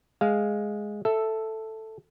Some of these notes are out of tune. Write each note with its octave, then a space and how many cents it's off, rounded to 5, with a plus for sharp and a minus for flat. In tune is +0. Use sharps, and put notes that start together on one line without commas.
G#3 +0 F5 +0
A4 +0 E5 +0